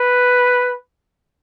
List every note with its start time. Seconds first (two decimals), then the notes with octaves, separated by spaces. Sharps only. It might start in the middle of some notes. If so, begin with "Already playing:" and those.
Already playing: B4